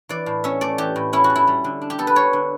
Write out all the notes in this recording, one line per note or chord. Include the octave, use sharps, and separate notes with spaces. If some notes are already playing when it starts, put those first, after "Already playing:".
E3 D5
A2
C#4 E5
A3 D5
E3 G4
A2
C#4 E4
F#4
A3
E4
G3
D3
D4
G4
B3 A4
B4
G3 C#5
D3